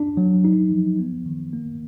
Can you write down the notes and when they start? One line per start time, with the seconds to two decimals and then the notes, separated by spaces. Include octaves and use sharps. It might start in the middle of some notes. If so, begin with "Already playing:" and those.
Already playing: D4
0.17 F#3
0.45 D#4
0.72 F3
0.99 B3
1.26 D#3
1.53 A#3